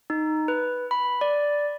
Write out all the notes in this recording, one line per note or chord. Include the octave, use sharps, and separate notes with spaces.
D#4
B4
B5
D5